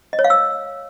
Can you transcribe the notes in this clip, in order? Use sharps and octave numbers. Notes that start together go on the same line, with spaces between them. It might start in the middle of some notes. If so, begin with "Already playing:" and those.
D#5
C#5
F5
E6